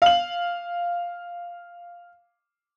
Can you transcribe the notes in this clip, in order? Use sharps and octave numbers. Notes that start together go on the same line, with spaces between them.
F5 F#7